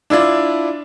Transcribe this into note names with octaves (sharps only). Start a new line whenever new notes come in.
D4 E4 F4 D5